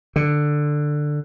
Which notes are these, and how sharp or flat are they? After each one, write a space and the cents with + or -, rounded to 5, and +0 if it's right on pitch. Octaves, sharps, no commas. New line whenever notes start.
D3 +10